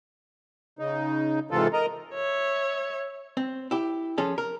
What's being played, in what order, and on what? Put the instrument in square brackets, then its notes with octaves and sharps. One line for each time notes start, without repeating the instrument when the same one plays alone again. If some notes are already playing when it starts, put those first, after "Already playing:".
[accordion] C#3 D#4
G#2 C3 E3 F4 A4
A#4 D#5 A#5
[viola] C#5 E5
[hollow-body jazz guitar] C4
E4 G4
F3 C#4 G#4 A4
A#4